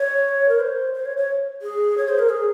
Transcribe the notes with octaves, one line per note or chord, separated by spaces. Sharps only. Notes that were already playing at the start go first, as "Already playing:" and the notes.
Already playing: C#5
A#4
C5
C5
C#5
C#5
G#4
C#5
C5
A#4
G#4